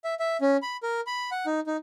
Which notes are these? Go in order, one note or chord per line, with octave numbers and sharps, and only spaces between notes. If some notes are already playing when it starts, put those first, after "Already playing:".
E5
E5
C#4
B5
A#4
B5
F#5
D#4
D#4